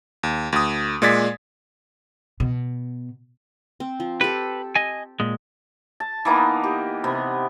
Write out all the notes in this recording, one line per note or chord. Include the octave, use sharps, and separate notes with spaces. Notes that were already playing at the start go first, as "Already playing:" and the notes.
D#2
D2 D#6
A#2 G#3 D5 G#6 A6 B6
B2
C4
F3
G4 A4 B4
D#5 G#5
A#2 G#3
A5
E3 A#3 B3 D#4
G4
C3 B3